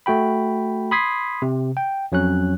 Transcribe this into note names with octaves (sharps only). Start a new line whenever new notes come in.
A3 F#4 G5 B5
B5 C6 D#6 G#6 B6 C7
C3
G5
F2 F#3 C#4 F#6